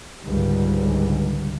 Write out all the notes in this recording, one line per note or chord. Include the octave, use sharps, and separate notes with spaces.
C#2 G#2 D3 G3